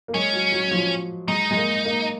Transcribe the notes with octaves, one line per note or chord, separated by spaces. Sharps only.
A#3
G#3 C#4
F#3
F#3
F3
G#3 D#4
G#3
A#3
A#3